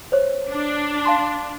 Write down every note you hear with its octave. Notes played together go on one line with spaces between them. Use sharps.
C5 C#5
D4
F5 A5 C6